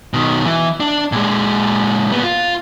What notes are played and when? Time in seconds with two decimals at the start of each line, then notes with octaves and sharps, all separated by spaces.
0.14 B2 D#3
0.46 E3
0.80 D4
1.12 A#2 G#3
2.12 A#2 B3
2.23 F4